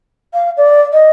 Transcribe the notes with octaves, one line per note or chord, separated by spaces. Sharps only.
F5
D5
D#5